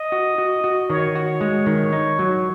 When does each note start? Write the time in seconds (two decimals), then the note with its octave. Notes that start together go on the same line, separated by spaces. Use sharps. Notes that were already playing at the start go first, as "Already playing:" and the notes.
Already playing: D#5
0.12 F#4
0.38 F#4
0.64 F#4
0.90 D#3 C#5
1.15 F#4
1.41 G#3
1.66 D#3
1.93 D#4
2.19 F#3